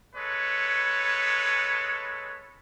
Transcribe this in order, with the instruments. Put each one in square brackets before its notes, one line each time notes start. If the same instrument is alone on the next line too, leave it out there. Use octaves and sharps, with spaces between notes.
[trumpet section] G#3 A4 B4 C#5